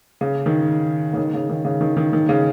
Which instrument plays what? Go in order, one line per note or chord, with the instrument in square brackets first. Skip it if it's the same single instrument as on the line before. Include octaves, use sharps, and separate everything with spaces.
[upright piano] C#3
D#3
C#3
D#3
C#3
D#3
C#3
D#3
D#3
D#3
C#3